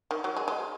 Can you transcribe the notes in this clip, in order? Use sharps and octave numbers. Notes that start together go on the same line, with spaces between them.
D#3
F#3
G#3
G#3